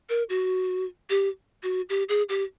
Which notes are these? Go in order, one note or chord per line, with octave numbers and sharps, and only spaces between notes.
A#4
F#4
G4
F#4
G4
G#4
G4